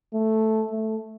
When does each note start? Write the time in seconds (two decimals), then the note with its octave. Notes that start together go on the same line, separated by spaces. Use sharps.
0.14 A3
0.71 A3